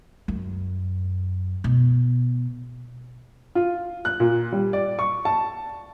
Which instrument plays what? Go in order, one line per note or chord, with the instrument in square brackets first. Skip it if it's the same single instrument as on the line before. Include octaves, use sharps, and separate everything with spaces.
[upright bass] F#2
B2
[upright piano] F4
F#6
A#2
G3
D5
C#6
A5